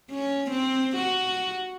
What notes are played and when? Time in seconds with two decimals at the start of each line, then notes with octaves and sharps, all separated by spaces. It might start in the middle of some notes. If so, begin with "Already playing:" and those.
0.10 C#4
0.51 C4
0.97 F#4